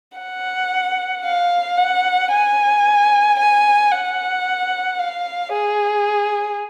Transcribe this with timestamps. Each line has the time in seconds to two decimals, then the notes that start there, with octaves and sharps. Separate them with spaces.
0.18 F#5
1.25 F5
1.78 F#5
2.32 G#5
3.39 G#5
3.92 F#5
4.99 F5
5.52 G#4